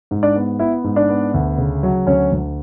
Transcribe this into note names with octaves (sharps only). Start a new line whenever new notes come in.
G#2
D4 D5
B3
B3 E4 E5
G#2
D4 D5
B3
D2
C#3
F#3
D2 C#4 C#5
D2